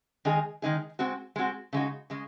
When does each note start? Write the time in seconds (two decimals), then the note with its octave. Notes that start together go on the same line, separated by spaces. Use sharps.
0.25 D#3 G#3 D#4 G#4
0.62 D#3 G#3 D#4 G#4
0.99 G#3 C4 F#4
1.36 G#3 C4 F#4
1.73 C#3 G#3 D#4 F#4
2.10 C#3 G#3